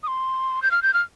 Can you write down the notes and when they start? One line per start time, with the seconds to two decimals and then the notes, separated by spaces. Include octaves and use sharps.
0.03 D#6
0.08 C6
0.62 G6
0.71 F6
0.83 G6
0.94 F6